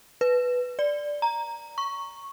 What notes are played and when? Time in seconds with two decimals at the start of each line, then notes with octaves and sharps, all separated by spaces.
0.21 B4
0.79 D5
1.22 A#5
1.78 C#6